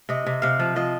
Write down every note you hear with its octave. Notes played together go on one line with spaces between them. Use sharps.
C3 D#5
C3
C3 F5
F3
F3 D#5